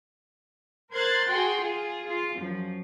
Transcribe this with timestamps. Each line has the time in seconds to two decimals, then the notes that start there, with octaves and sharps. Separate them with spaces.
0.92 A#4 C5 C6 F#6 G#6 A6
1.29 F#4 G#4 F#5 G5 C6
1.61 F4 G#4
2.06 F4
2.37 F#2 F3